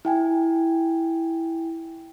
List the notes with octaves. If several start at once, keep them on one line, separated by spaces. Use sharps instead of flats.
E4 G5 G#5